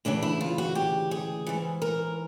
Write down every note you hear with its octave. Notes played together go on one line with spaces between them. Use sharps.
D2 C#3 E3 D4
E4
F4
F#4
G4
G#4
G#2 E3
A#4